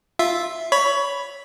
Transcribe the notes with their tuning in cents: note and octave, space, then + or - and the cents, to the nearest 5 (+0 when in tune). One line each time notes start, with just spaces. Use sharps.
F4 +0 E5 +0
C#5 +20 B5 +0